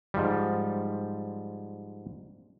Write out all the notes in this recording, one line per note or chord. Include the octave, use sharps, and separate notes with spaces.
G#2 F3 G3